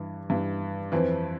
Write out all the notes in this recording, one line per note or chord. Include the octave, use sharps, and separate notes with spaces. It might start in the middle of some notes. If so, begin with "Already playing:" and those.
Already playing: G2 E3
G2 E3
F2 E3 C4